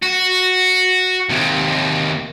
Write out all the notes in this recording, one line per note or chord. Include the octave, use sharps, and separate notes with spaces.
F#4
D#2 C3